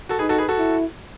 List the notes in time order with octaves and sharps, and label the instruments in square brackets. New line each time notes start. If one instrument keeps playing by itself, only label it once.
[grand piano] F#4 A4
[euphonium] D#4 [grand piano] G#4 B4
[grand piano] F#4 A4
G#4 B4
F#4 A4
[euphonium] E4